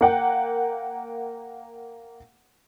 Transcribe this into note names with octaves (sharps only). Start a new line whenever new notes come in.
A#3 F#5 G5